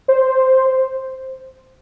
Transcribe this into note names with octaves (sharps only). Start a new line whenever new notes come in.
C5